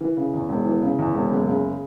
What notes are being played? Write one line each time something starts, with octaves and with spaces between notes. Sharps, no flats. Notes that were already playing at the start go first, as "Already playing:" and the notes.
E3
C#3
E2
E1
E3
C#3
E2
E1
F#1
C#3